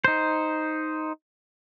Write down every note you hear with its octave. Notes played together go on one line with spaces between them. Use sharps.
D#4 C5